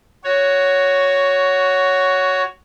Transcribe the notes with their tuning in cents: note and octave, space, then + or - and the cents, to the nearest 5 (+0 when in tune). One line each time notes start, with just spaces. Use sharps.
F#4 +0 C#5 +10